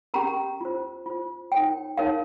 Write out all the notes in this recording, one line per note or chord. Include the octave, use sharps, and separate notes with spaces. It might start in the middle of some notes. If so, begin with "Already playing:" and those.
C#4 G4 A#4 A#5
F4 C5
F4 C5
D#4 A#4 C#5 G5
D#4 A#4 C#5 F5